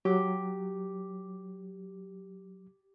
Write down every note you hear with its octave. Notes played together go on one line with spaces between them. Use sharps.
F#3 G4